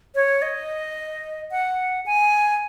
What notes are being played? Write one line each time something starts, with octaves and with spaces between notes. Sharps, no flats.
C#5
D#5
F#5
G#5